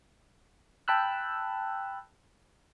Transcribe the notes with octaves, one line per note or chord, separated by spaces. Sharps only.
G5 A5 B5 E6 F#6